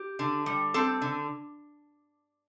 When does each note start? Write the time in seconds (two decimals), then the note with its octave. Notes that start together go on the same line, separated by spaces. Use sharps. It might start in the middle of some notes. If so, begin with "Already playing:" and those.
Already playing: G4
0.19 D3
0.46 G3
0.74 C4 A4
1.02 D3